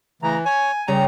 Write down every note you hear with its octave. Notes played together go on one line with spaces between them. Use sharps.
C#3 E3 A3 A#5
C#5 G#5
C#3 G3 A#5